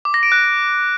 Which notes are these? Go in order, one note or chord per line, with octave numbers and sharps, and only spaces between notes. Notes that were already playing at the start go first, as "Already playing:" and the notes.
D6
A#6
D7
F#6